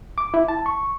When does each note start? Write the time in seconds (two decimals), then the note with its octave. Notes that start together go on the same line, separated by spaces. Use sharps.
0.18 D6
0.34 E4
0.48 A5
0.66 C#6